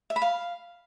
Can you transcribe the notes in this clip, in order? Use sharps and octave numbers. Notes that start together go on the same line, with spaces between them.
E5
B5
F5